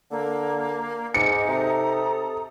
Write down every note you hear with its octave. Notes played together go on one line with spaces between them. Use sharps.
D3 A#3
G#2 D#4 G#5 D6 C#7
C3 A4 A#5 D#6